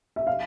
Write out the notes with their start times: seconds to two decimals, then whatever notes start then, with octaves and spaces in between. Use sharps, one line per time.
0.16 E5
0.27 F5